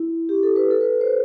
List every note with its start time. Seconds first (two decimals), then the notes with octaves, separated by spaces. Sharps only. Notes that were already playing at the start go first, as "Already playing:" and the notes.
Already playing: E4
0.29 G4
0.43 A4
0.56 B4
0.70 A4
0.81 B4
1.01 C5